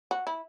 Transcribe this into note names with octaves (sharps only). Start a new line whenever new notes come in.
F#4
E4